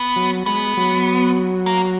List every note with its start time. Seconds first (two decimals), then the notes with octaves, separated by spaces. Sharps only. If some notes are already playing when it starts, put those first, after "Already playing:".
Already playing: B3
0.16 F#3
0.46 G#3 B3
0.77 F#3
1.66 A#3